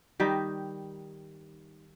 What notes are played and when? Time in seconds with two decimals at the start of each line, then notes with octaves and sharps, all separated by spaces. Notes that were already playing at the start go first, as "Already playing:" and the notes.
0.20 D#3 G3 D#4 G4